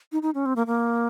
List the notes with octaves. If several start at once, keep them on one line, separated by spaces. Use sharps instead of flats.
D#4
D#4
C#4
C4
A#3
A#3